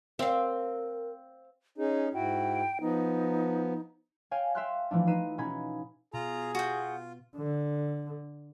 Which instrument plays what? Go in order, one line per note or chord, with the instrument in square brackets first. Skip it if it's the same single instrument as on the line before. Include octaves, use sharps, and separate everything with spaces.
[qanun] C4 [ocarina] A#4 [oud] E5 F5
[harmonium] C#4 D#4 [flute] G#4
[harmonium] G#2 E4 F#4 [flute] G5
[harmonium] F3 B3 [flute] D#4
[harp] C#5 F5 G5 G#5
E5 F5 G5 C6 F6 F#6
E3 F3 A3 D4
D#4 B4 C7 D#7 E7
B2 C#4 D#4 B5 G#6
[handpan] B2 [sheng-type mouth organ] F4 A#5 [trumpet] G#4
[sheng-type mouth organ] F4 [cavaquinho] F#4 G5
[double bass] D3